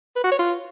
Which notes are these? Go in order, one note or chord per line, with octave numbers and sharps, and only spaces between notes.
B4
F#4
C#5
F4